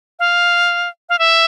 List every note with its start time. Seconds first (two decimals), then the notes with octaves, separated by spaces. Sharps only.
0.19 F5
1.09 F5
1.19 E5